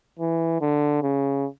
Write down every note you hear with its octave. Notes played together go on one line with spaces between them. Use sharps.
E3
D3
C#3